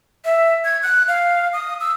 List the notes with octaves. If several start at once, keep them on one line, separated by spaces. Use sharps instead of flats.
E5
G#6
F#6
F5
D#6
E6